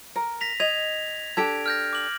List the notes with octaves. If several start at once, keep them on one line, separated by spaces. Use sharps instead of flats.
A#4
A#6 B6 F7
D#5 G#6 A#6 F7
D4 G4 A4 G#6 D7
F6 G6 A#6
D6 F#7